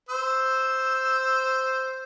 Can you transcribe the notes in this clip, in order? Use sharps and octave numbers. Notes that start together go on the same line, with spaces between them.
C5 E6